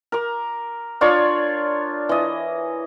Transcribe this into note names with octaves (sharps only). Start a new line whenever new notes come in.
A#4 D6
D4 F4 C#5 D5
E3 D#5